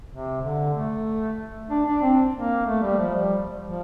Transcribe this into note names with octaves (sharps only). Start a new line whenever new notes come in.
C3
D3
A3
D4
D4
C4
A#3
A3
G3
F3
G3
F3